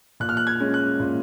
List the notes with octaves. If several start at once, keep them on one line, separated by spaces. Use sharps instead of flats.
A#2 F#6
F6
F#6
G#6
G#3 C#4
F#6
A#2